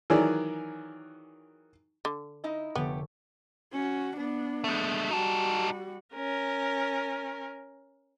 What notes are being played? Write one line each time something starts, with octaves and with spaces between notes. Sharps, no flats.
D#3 E3 F#3 G#4 D5
D3
D#4 E4 D#5
F1 D3 A3 B3 G4 C#5 G5
C#4 F#4
B3 D4
G#3 A3
G3 D#4 F#4 A4
C#4 A#4